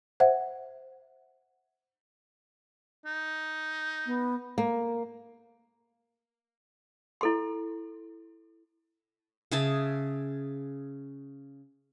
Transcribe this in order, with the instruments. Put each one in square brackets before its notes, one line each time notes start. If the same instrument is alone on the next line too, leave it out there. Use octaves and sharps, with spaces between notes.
[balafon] C5 E5 F#5
[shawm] D#4
[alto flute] B3
[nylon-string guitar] A#3
[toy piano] E4 A4 C6
[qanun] C#3 G#4 E5 A5